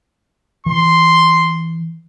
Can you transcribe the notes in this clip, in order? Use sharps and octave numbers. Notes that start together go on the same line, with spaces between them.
E3 C6